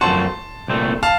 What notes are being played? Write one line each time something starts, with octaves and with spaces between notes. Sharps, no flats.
F#2 F3 A3 C4 F#4 A5 C6
C2 A#2 A3 C4
F5 A5